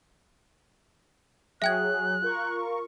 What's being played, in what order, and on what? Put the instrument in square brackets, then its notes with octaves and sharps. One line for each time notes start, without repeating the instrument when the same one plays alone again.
[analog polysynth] F#3 G#4 [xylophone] E5 G5 G#6 [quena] F#6
[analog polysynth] F4 A#4 C#6